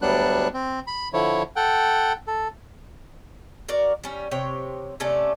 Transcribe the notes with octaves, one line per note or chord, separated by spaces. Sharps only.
D2 F#3 G3 B3 D4 F#6
C4
B5
D3 F3 E4 C#5
A4 F#5 G5
A4
F#4 A#4 D5
G3 C#4
C3 C#5 G5
C3 A3 C#4 D5